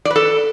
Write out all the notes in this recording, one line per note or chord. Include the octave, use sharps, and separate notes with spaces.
D5
B4
A4